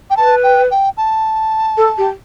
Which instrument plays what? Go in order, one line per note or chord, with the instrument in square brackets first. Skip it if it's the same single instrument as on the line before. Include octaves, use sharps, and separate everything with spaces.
[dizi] G5
[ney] B4 [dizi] A5
[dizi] G5
G5
A5
[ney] A4
G4